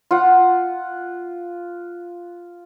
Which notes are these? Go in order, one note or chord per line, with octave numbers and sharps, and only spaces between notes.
F4 F#5